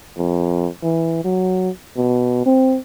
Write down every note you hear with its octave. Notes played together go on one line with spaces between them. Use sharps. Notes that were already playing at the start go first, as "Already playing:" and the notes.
F2
E3
F#3
B2
C4